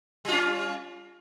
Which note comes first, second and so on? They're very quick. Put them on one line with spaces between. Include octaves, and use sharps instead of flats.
G3 F4 C#4